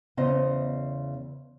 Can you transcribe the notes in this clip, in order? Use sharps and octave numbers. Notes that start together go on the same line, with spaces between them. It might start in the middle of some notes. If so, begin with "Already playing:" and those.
E2 C#3 B3 C5 D#5